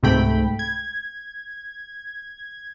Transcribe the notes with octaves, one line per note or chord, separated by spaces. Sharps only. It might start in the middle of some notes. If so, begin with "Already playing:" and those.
C#2 G#2 C3 A3 G5 B5
G#6